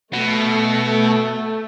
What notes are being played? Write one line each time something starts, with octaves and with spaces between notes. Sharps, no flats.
B2 A3